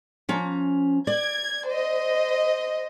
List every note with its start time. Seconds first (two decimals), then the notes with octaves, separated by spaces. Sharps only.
0.29 F3 C#4 A#5
1.07 D5 G#6
1.69 C5 D#5